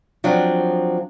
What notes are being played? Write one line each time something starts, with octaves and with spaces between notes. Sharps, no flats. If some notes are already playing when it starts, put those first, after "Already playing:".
F3 F#3 C4 D4